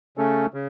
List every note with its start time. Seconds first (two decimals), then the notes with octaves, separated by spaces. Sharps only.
0.17 C#3 A3 C#4 A4
0.54 C#3